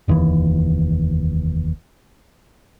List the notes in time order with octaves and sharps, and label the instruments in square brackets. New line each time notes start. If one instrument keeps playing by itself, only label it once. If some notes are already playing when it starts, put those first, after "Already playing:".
[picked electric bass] F1 D#2 A#2 E3